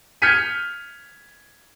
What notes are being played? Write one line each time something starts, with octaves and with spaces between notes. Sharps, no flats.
F6 G6 G#6 B6 C#7 D#7